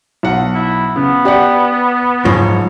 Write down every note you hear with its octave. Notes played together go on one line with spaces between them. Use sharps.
B1 F#5
E4
C#3 B3
G4 D5 F#5
F#1 G#2 F3 C#5